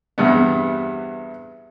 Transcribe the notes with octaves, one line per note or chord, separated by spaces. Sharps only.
E2 G2 C3 B3